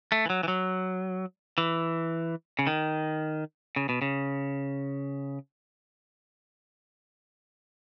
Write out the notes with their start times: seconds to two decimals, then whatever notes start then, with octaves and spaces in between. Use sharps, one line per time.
0.12 A3
0.26 E3
0.30 F#3
0.43 E3
0.48 F#3
1.58 E3
2.59 C#3
2.67 D#3
3.76 C#3
3.89 B2
4.02 C#3